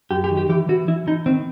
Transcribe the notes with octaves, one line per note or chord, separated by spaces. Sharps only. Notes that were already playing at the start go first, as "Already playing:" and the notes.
F#2 G4
G4
D#3
G4
E3 G4
E3 F#4
E3 E4
E3 D#4
D#3 C4